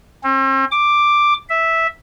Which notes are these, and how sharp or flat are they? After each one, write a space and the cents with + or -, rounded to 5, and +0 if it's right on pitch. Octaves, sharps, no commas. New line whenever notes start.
C4 +45
D6 +5
E5 -5